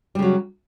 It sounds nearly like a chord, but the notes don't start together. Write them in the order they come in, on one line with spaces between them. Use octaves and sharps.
G3 C#3 F#3